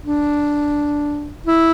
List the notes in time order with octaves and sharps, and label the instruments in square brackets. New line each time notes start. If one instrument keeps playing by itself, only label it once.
[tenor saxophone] D4
E4